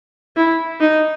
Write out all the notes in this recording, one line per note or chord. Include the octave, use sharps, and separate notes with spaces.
E4
D#4